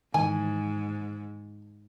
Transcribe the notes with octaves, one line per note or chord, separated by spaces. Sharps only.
G#2 D#3 E3 G#5